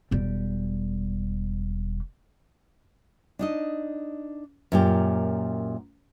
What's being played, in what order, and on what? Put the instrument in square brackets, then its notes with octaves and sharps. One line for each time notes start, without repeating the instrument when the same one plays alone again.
[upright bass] E1 G3
[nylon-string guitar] D4 D#4 D#5
F#2 A#2 G4